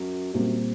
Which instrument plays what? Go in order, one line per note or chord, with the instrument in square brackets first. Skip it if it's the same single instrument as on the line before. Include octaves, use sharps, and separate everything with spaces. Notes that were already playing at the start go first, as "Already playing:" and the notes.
Already playing: [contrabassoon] F#2
[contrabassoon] F#2 [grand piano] A#2 G3 C4